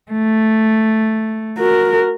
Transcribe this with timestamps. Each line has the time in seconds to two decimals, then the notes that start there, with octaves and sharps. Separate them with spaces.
0.13 A3
1.58 F#4 A#4